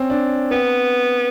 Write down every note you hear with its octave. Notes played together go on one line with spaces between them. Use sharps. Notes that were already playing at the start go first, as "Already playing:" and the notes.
Already playing: C4 C#4
D4
B3 C4